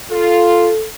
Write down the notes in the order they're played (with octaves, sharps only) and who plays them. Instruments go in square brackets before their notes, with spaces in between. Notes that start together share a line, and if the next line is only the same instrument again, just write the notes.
[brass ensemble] F4 [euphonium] A4